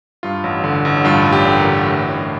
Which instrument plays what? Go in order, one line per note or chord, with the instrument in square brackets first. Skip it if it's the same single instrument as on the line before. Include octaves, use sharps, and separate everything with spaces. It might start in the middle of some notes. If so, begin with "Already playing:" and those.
[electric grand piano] G2 F4
A1
D3
A1
G2 F4
A1
G4
D3
A#4
A1
A2
A1